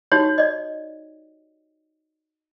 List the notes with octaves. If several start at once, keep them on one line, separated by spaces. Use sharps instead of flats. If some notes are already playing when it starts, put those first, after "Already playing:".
D#4 F#4 G4 C#5
D5 D#5